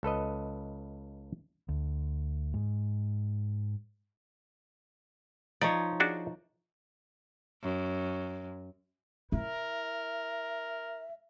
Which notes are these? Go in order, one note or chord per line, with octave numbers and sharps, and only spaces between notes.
C#2 A4 B4 D#5
D2
G#2
F3 D#4 C#5 D5
D4 F#4 G#4
F#2
E4 A#4 E5